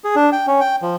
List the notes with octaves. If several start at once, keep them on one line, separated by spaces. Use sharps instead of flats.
G#4
D4
G5
C#4
G5
F3